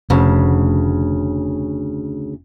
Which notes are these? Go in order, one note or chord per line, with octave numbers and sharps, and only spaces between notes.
F1 D2 C#3